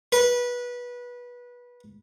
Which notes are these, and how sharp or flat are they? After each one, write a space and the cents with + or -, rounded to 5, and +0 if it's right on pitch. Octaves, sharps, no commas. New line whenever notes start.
B4 -20